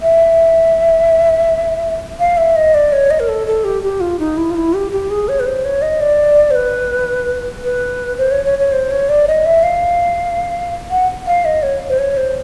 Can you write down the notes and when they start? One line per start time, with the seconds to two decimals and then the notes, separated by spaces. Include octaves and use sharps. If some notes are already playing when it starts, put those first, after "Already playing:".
0.02 E5
2.19 F5
2.37 E5
2.56 D#5
2.74 D5
2.92 C#5
3.10 D#5
3.20 A#4
3.28 A4
3.47 A4
3.64 G4
3.83 G4
4.00 F4
4.19 D#4
4.37 E4
4.50 F4
4.55 E4
4.74 G4
4.92 G4
5.10 G#4
5.29 C#5
5.40 B4
5.47 C5
5.65 C#5
5.82 D#5
6.01 D5
6.51 C5
6.55 B4
7.64 B4
8.18 C5
8.31 C#5
8.45 C#5
8.59 C#5
8.72 C5
8.91 C#5
9.09 D5
9.28 D#5
9.46 E5
9.63 F5
10.91 F#5
11.27 F5
11.45 D#5
11.63 C#5
11.89 C5
11.99 C#5
12.17 C5